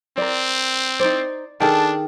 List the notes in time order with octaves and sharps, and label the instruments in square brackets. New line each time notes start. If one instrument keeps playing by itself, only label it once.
[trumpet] C4 [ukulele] A#4 D5
[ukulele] D#4 C5 [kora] D5
[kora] D#3 G#4 A4 [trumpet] D4 [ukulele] G5 [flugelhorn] A5